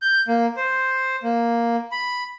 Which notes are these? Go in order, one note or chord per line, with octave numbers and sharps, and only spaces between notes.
G6
A#3
C5
A#3
B5